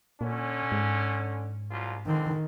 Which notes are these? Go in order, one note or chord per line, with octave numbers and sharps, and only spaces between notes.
A#2 D3 C#4
G#2
C2 F#3 F4
C#2 D3 D#3 C4